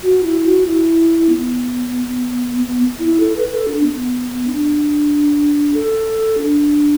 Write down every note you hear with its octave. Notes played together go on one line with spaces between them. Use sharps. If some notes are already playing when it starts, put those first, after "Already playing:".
F#4
E4
F#4
E4
B3
B3
E4
A4
B4
A4
D4
B3
D4
A4
D4